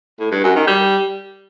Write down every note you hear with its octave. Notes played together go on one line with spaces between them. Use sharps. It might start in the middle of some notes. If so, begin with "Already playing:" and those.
A2
G2
F#2
D#3
G3